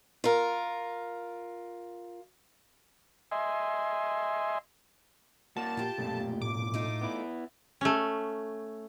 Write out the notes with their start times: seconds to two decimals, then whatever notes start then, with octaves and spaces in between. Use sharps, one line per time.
0.24 F4 A#4
3.32 D#5 E5 G#5 C6
5.57 A#3 F#4 A5
5.77 A#2 F4 G4
5.98 B1 F#2 A#2 A3
6.42 A2 D6
6.74 A3 D#4 F4
7.01 B3 E4
7.81 A3 C#4